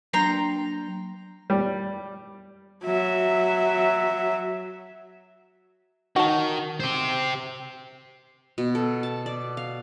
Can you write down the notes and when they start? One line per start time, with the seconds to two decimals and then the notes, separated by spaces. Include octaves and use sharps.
0.14 F#3 A#3 D4 G5 A#5 C6
1.50 G3
2.84 F#3 E5
6.16 D#3 F#4 A5
6.80 G4 C5
8.58 B2
8.75 A4
9.03 A5
9.26 D5
9.57 F5